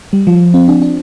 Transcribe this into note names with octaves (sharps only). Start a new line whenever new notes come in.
G3
F3
C4
D4
D4